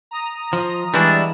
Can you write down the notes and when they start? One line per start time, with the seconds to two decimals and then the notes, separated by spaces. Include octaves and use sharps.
0.11 A#5 D#6
0.53 F3 D#5
0.94 E3 G3 G#3 D4 E4 F#4